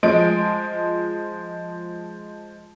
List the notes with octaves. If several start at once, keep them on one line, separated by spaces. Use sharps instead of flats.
F3 G#3 D7